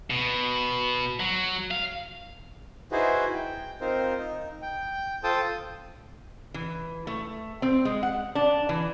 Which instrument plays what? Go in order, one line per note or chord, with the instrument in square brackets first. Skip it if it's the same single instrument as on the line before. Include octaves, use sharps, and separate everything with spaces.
[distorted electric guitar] B2
F#3
F5
[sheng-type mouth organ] D#4 E4 F#4 G#4 B4 C5
G5
C4 D#4 F4 A#4 C5
D#4
G5
F4 A4 C5 G5 A5 D#6
[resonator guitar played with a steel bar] E3
A3
C4
G#3
F#5
D4
E3